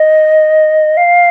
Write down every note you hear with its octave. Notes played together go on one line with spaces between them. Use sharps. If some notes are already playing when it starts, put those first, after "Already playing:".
Already playing: D#5
F5